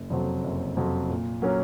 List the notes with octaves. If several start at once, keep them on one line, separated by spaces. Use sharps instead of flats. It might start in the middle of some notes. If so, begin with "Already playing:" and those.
Already playing: F#1
F2 C3 F#3 C4
F#1
F2 C3 F#3 C4
A#2
F#3 A#3 C#4